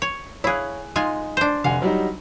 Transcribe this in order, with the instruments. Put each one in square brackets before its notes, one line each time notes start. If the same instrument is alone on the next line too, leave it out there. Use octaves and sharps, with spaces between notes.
[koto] C#5
[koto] E4 G#4 [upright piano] C#5 F5 F#6
[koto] G#3 F4 G#5 [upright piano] D#4
[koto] D4 C5
[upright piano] F1 F#5 G#5 [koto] F5
[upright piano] F#3 G3 D#4